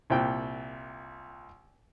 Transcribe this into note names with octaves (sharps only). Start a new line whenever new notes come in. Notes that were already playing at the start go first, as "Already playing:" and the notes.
C2 A#2 G5